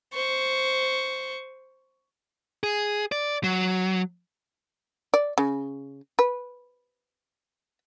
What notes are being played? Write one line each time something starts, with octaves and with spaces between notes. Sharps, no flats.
C5 C#6
G#4
D5
F#3
D5
C#3
B4